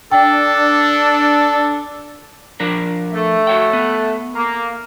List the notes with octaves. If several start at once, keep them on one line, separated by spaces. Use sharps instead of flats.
D4 A4 G5
F3 D4 A#4
A3
F#4 C#5 G5
B3
A#3